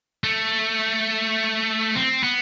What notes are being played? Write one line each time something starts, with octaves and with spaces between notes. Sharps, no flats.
A3
C4
B3